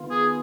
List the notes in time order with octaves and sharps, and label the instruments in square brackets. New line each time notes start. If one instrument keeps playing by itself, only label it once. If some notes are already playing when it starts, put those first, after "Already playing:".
Already playing: [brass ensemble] D#3 B3 F4
[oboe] G#4